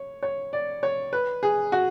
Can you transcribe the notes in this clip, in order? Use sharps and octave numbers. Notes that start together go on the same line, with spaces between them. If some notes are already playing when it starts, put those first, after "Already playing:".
Already playing: C#5
C#5
D5
C#5
B4
G#4
F#4